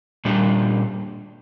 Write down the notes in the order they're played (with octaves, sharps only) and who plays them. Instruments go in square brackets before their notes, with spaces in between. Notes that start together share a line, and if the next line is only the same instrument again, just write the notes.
[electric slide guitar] A#2 G3 A#3 D4